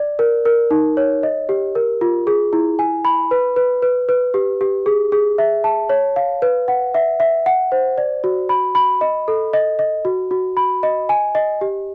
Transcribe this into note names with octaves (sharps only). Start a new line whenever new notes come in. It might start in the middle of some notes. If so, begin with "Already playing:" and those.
Already playing: D5
A#4
A#4
D#4
C#5
D#5
G4
A#4
F4
G#4
E4
G#5
B5
B4
B4
B4
B4
G4
G4
G#4
G#4
E5
A5
C#5
F5
B4
F#5
E5
E5
F#5
C5
D5
F#4
B5
B5
D#5
A4
D#5
D#5
F#4
F#4
B5
D#5
G#5
D#5
G4